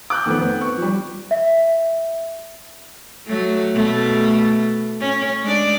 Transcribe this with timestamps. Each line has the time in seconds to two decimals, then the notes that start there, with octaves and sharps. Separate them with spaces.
0.10 D6 F#6 G6
0.25 F2 D#3 A3 B3
0.40 B3 C4
0.61 C#6
0.77 F3 G3
1.31 E5
3.27 F#3 A3
3.74 B2 A3
5.01 C#4
5.43 G#3 D4 D5